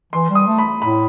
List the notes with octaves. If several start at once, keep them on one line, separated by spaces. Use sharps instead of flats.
E3 C6
G3
D#6
A3
B5
A2 B5